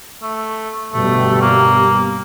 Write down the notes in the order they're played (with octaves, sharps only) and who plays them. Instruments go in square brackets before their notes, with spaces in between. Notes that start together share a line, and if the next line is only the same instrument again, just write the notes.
[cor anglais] A3
[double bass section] G1 B2 G3 [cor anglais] A3
[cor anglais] A#3